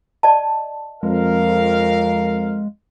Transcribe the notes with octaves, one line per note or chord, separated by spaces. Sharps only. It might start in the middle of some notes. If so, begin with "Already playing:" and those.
D5 D#5 A5
F2 G#3 A#4 F5